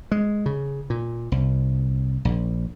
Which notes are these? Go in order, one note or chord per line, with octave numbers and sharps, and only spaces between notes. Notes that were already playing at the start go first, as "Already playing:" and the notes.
G#3
C#3
A#2
C2
A#1